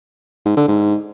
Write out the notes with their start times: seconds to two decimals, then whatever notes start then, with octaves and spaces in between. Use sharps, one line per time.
0.45 G#2
0.57 D3
0.68 G#2